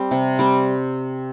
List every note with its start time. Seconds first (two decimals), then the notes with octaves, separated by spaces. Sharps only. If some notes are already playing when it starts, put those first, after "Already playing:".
Already playing: G3 C4 G4
0.11 C3
0.39 G3 C4